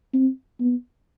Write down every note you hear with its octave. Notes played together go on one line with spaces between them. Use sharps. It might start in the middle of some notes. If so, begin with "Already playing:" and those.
C4
B3